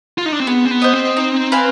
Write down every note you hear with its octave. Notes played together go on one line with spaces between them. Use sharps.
F4
D#4
D4
C4
B3 G#4
C4
B3
C5 D#5
C4
D#4
B4 F5 G#5